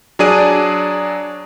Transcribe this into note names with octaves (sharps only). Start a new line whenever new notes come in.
F#3 D4 G#4 D5 D#7